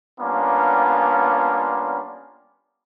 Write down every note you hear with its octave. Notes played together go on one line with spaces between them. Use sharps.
G3 A#3 B3 C#4 D4 F4